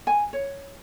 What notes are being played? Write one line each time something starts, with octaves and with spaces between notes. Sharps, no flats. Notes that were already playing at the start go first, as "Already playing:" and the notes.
G#5
C#5